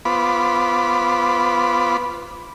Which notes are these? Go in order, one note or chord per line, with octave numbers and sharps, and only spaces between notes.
B3 F4 C5 B5 D6